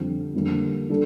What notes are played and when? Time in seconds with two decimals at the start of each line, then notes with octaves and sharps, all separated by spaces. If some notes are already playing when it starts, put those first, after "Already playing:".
Already playing: F2 D3 G3 C4 F4
0.34 F2 D3 G3 A#3
0.90 G3 D4 A4